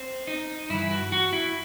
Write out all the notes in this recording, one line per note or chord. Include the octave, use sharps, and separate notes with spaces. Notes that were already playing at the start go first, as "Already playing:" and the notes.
Already playing: C4
D#4
G2 E3 E4
F#4
F#4
E4